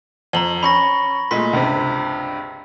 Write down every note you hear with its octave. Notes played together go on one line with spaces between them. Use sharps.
F2 A#5 F#7 G7
C#4 B5 C#6 A#6
A#2 G#3 A3 C6 B6
C#2 G2 C3